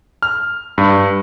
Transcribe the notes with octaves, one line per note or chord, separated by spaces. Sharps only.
F6
G2